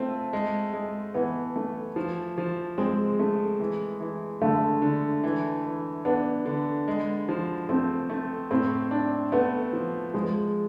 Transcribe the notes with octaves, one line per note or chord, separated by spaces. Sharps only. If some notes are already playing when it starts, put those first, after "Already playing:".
Already playing: A3 C4 F4
G#3
G#3
E3 B3
A3
F3
F3
G#3 C4
A3
E3
E3
D3 A3
D3
E3
E3
B3 D4
D3
G#3
F3
A3 C4
A3
A2 C4
D4
A3 B3
F3
F3 G#3